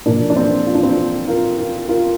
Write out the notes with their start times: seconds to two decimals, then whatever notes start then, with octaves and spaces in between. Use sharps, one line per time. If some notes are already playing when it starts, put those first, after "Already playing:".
0.06 A#2 F3 A#3 D4
0.30 D4
0.36 C4
0.67 F4
0.75 D4
0.83 C4 F4
1.28 F4 A#4
1.58 F4 A#4
1.88 F4 A#4